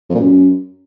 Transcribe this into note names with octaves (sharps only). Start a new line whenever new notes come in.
F2
A#2
F#2